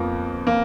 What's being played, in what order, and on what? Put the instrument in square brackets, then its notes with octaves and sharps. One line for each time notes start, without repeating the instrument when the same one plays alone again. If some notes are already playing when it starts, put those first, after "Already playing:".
Already playing: [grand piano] F2 F3 B3 F4 [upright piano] A#3
[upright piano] A#3